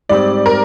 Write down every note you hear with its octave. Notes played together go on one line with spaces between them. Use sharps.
G#2 G3 C4 D5
A#4